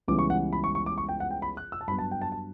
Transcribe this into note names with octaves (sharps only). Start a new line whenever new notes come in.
C#2 C#3 E3 G3 B3 D6
C#6
F#5
B5
C#6
C#6
D6
C#6
G5
F#5
G5
B5
F#6
E6
A5
G2 F#3 B3 B5
A5
G5
A5
A5